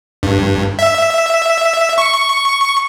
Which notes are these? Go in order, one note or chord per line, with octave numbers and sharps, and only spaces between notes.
G2
E5
C#6